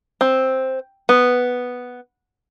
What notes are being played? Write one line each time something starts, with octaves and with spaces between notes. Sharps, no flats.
C4
B3